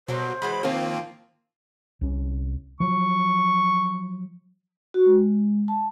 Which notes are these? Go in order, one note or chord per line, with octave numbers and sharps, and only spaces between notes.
B2 F#3 G3 A#3 C5
E3 F#3 G#3 B5
D#3 F3 A#3 C4 F4
C2 C#4
F3 F#3 C#6
F#4
G#3
A5